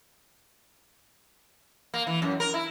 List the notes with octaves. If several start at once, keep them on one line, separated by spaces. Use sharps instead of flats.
A#3
E3
F#2
A#4
E4